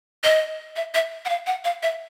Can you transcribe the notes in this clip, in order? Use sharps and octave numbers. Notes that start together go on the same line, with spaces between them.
D#5
E5
E5
F#5
F5
F#5
F5
E5